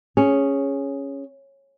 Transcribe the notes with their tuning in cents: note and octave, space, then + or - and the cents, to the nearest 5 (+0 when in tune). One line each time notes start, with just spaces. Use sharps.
C#4 +0 G#4 +0